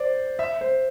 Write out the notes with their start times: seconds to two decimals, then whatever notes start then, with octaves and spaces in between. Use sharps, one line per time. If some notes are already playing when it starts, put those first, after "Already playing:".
Already playing: C5 D5
0.39 E5
0.61 C5